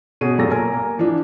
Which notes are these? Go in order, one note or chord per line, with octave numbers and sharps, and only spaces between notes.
B2 C#4 G#4 D#7
F#1 F#2 A#2 G4 A4 A#6
A#4 G#5
A#3
E3 F3 D4